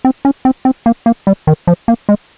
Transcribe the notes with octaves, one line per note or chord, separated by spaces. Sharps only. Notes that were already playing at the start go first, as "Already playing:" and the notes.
C4
C#4
C4
C4
A#3
A#3
G3
D#3
F3
A#3
G#3